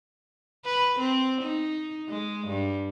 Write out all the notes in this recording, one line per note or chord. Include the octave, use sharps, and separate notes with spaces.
B4
C4
D#4
G#3
G2